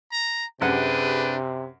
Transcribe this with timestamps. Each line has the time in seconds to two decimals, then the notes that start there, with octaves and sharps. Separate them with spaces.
0.12 A#5
0.61 F#2 C3 D4 G4 G#4 B4 F#5